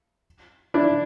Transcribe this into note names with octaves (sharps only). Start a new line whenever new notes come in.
D4 E4